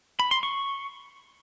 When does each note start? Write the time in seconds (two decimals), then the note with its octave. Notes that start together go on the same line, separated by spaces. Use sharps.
0.20 B5
0.31 C6
0.43 C#6